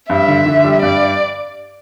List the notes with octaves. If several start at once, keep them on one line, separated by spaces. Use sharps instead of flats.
G2 E5
D3
D3
G3
G2 D5